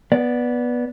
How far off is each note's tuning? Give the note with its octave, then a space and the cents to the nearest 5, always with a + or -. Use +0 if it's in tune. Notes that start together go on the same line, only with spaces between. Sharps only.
B3 -10 D5 -5